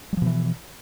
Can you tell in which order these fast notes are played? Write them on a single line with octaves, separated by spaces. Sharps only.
G3 F3 B2 E3